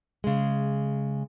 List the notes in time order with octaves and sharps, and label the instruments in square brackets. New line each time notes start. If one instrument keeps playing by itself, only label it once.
[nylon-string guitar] C#3 G#3